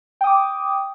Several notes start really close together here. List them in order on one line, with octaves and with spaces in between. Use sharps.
G5 D#6 D6